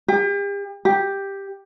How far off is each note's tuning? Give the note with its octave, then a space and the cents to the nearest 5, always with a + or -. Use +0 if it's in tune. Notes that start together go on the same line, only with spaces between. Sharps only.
G4 +40
G4 +5